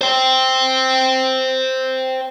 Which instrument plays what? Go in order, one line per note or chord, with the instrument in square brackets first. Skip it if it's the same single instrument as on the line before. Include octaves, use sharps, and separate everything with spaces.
[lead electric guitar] C5 G5